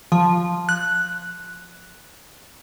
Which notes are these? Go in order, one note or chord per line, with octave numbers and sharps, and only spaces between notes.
F3
F#6